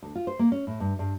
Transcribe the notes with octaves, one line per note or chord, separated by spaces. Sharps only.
D2
F4
C5
A#3
C#4
A2
G2
G2